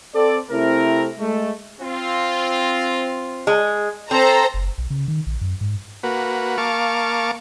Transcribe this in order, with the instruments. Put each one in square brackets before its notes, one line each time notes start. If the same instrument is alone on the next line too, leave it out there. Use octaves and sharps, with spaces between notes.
[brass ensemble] C4 A4 D5
C3 A3 C4 E4 A#4
G#3 A3
C4 F4
[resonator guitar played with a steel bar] G#3
[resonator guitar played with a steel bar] C4 [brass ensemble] A4 [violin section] C5 A#5
[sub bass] F#1
B1
C#3
D#3
A#1
F#2
G#2
[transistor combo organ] A#3 F#4 B4
A#3 F5 A5 C#6 D6